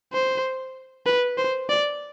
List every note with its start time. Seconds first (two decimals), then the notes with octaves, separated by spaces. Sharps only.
0.13 C5
1.06 B4
1.38 C5
1.69 D5